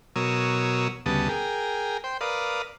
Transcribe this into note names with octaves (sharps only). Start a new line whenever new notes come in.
B2 F#3 A#4 C#5 D#6 E6
D2 C#3 G3 B3 A5 D#6
G#4 A#4 G5
C5 G5
A#4 B4 D5 F5 D#6